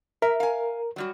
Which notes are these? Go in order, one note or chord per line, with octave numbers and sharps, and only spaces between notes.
A#4 E5
F5 G#5
F#3 G3 F#4